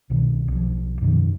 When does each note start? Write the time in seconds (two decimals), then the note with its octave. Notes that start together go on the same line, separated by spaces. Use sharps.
0.10 C2 B2 D#3
0.48 B1 F3
1.01 F#2 B2 D#3 F3